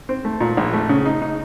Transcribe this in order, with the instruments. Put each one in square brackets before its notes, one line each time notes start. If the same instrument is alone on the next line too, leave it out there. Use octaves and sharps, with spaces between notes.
[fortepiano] C4
A3
A#2
A#1
A3
C#3
D#4
D#4